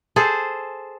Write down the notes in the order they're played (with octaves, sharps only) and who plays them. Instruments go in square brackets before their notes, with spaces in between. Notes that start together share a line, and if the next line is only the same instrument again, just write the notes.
[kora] G#4 A4 C5